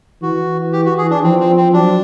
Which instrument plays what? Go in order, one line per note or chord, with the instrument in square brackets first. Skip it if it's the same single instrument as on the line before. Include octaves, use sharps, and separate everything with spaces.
[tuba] E3 [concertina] F#4
[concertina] G4
F#4
G#4
D4
[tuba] F3 [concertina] C4
[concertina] C4
C4
[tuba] F#3 [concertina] D4